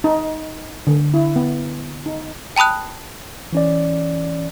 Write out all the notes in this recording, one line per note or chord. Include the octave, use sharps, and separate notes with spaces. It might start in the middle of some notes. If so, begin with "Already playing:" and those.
D#4
D3
E4
B3
D#4
G5 A5 B5 D#6 F#6
E3 C#4 D5